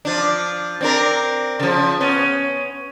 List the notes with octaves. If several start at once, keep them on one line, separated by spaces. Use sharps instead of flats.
F3 D4
C4 D4 A#4
C#3 F3
B3 C#4